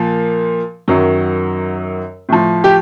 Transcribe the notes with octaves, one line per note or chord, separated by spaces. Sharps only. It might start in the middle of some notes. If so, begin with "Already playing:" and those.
Already playing: A#2 F3
F#2 D#3 F#3
A2 F3
G4